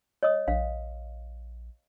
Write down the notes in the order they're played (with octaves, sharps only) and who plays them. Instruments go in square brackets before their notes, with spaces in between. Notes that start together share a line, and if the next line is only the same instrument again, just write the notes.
[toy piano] C#5 D#5 D#6
[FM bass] A#1 [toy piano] F5